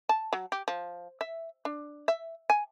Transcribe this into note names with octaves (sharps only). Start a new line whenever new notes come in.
A5
F#3
G4
F3
E5
D4
E5
G#5